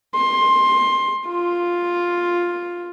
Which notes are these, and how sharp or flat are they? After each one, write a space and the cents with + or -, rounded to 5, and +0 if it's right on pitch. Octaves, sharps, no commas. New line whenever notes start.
C6 +15
F4 +5